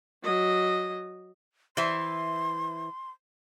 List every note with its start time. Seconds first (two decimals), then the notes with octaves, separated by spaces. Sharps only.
0.23 F#3 D#5
1.77 E3 C5 E5 C6